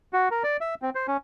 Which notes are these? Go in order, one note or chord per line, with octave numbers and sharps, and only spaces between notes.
F#4
A#4
D5
E5
C4
C5
C#4